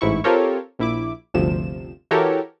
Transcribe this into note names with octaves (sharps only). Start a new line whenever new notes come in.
A1 G#2 E4 C#6
C4 F4 G4 A4 A#4 C#5
A#1 E4 D6
G1 D2 C3 F3 E7
E3 F#4 G4 A4 A#4 C#5